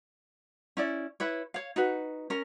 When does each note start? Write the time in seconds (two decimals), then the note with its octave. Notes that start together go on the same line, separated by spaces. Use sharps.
0.77 C#4 E4 D5
1.20 E4 B4 C#5
1.54 C#5 F5
1.76 D#4 F#4 B4
2.30 C#4 A#4